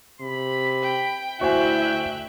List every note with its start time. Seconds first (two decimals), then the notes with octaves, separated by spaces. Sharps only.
0.21 C3 B5
0.82 G5
1.41 D2 E4 F#4 C5 E5 G5 G#5 F#6